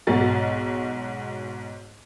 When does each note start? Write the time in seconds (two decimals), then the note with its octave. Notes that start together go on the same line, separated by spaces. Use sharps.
0.07 B1 G#2 F#4 A6